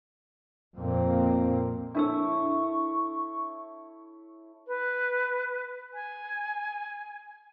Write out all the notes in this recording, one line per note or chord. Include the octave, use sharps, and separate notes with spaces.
F2 A#2 A#3 C4
D4 E4 A4 A#4 C#5 C#6 E6
B4
G#5